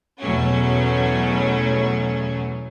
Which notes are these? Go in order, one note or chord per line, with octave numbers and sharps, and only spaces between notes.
E2 B2 F#3 A3 C#4